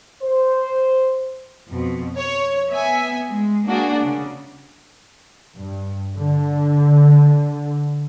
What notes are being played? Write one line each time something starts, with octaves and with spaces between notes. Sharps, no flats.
C5
F2 B2
C#5
B3 E5 G#5
G#3
A#3 D4 F#4 G#4
C#3
G2
D3